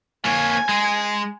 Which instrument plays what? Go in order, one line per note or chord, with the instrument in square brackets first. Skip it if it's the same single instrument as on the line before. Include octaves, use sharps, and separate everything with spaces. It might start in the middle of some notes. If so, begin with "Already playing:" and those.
[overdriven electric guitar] A#3 C#5 [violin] G#5 G#6
[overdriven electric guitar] G#3